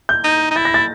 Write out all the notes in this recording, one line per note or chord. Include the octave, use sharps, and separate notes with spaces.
G6
D#4
D#4
E4 A6
A#6
A6